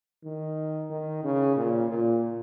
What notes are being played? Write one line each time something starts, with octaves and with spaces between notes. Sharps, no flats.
D#3
D#3
C#3
A#2
A#2